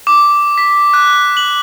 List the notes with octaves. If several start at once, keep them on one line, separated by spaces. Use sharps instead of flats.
D6
B6
F#6
F#7